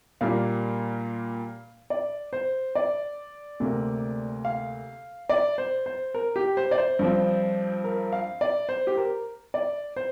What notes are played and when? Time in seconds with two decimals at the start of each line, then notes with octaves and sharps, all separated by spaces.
0.21 A#2 G3 A#3 D4 F5
1.90 D5
2.33 C5
2.75 D5
3.60 D2 C3 A#3
4.45 F5
5.29 D5
5.58 C5
5.86 C5
6.14 A#4
6.36 G4
6.57 C5
6.71 D5
6.78 C5
6.99 G2 F3 C4
7.84 A#4
8.12 F5
8.41 D5
8.69 C5
8.87 G4
8.97 A#4
9.54 D5
9.96 C5